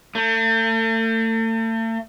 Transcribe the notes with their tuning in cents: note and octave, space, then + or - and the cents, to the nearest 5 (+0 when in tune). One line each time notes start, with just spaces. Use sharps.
A3 +40